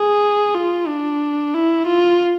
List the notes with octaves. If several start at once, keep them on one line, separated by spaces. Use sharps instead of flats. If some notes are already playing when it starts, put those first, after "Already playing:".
Already playing: G#4
F4
D4
E4
F4